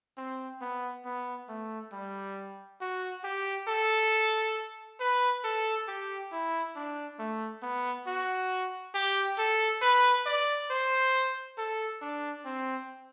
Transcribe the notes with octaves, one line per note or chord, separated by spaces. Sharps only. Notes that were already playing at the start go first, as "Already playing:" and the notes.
C4
B3
B3
A3
G3
F#4
G4
A4
B4
A4
G4
E4
D4
A3
B3
F#4
G4
A4
B4
D5
C5
A4
D4
C4